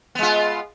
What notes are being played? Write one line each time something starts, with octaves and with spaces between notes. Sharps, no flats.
G#3 B3 F4